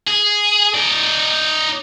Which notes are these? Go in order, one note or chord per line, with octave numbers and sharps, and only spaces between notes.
G#4
D#4 D5